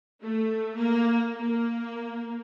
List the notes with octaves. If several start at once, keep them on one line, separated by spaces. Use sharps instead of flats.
A3
A#3
A#3